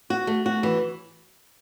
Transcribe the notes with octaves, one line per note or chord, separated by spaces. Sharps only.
F#4
A3
F#4
E3